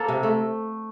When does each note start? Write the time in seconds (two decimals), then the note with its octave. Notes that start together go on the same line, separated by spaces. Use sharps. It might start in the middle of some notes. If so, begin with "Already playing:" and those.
Already playing: A#3 A4 C5
0.08 C3
0.23 A3